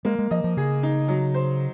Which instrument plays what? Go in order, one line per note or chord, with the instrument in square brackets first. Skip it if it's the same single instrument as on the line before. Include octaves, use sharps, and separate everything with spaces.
[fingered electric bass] G#3 [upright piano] A#3
[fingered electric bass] G#3
[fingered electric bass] F3 [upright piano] D#5
[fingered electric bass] F3
[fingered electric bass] C#3 [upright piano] G#4
[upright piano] D#4
F#3
C5